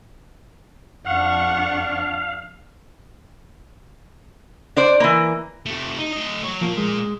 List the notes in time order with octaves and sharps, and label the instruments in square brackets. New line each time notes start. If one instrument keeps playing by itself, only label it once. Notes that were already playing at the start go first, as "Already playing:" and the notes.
[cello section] F2 D4 [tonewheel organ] F5 [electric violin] F#5 C#6
[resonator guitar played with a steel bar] D4 C5 D5
E3 A#3
[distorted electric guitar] C3 A3
D#4
A3 D#5
F#3 C#5
[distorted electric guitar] A#2 A#3 [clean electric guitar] F3
[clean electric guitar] G#3